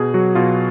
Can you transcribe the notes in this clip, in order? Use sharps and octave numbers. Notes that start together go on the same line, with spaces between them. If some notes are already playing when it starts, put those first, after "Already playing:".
Already playing: B2 G#4
F#3 F#4
B2 F4